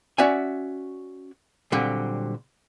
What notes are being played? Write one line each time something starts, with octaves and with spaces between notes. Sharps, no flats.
C#4 F#4 D5 E5 G#5
A#2 D3 F#3 G3 C4